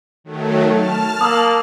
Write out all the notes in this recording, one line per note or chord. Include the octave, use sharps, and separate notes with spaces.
D#3 F#3 A3
A5 F6
A#3 D#6 E6